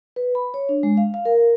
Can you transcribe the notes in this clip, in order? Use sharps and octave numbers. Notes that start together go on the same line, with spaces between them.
B4
B5
C#5
D4
G#3
F5
F5
A#4